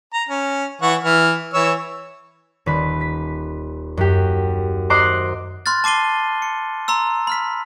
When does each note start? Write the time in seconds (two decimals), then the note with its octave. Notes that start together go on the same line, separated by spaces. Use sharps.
0.14 A#5
0.29 C#4
0.82 E3 F#5 C#6
1.03 E3 F6
1.54 E3 C#5 E6
2.66 D#1 B4
3.01 B6
3.97 F#2 G4
4.90 C5 D#5 A#5 C6 D6 F#6
5.66 B5 C6 F6 F#6 A6
5.84 A5 D6 C7 D#7 G7
6.42 C#7
6.88 A#5 C6 E6
7.27 B5 F6 B6